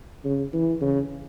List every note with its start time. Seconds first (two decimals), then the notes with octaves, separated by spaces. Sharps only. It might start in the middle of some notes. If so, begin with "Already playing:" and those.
0.25 C#3
0.53 E3
0.81 C#3